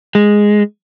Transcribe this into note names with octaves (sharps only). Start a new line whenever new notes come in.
G#3